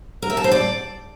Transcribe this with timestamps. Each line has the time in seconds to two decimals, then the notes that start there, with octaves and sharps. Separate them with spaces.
0.22 A#4
0.30 E5
0.37 A5
0.44 C5
0.52 D5